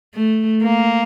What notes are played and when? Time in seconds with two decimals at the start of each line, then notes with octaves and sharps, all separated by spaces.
0.14 A3
0.63 A#3